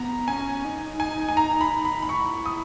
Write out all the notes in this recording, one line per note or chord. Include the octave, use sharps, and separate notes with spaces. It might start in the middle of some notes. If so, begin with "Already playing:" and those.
Already playing: B3 A#5
C#4 G#5
D#4
G#5
G#5
A#5
B5
B5
B5
E4 C#6
D#6